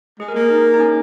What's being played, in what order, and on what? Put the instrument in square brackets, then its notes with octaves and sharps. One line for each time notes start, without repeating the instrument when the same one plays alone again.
[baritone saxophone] G#3 [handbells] G#4
[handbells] A#4
[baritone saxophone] A#3 [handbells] G#4
[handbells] D#4
D#4
C#4